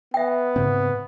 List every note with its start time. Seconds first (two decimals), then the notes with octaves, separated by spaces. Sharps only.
0.14 B3 E5 G5
0.56 G#2 C#3 C4